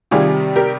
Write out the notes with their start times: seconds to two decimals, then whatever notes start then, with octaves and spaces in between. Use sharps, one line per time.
0.11 C3 D#3 G3 F4 G#4
0.56 G4 A#4